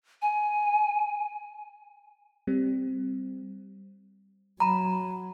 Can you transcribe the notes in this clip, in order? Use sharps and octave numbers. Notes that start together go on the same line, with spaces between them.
G#5
G3 C4
F#3 A#5 B5